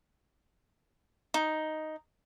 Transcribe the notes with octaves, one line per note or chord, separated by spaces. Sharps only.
D#4